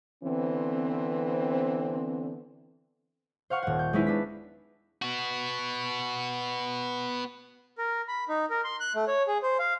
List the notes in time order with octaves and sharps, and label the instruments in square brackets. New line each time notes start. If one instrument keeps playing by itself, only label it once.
[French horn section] D3 E3 B3 C4
[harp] C5 F5 F#5 C#6 F6
D#1 F#5
G6
G#3 B3 C#4 D#4 E4 B4
D4 B6
[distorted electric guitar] B3 F#4
[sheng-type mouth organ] A#4
B5
D#4
A#4
C6
F#6
A3
C#5
G#4
C5
F5